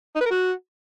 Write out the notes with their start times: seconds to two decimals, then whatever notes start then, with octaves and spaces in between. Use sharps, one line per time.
0.16 D#4
0.21 B4
0.26 A#4
0.31 F#4